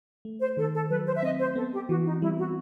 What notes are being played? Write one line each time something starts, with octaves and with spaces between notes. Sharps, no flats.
A3
C5
D#3 A4
A4
F#3 B4
C5
E5
C4 D#5
C5
B3 A4
G4
E3 F#4
D#4
G3 E4
F#4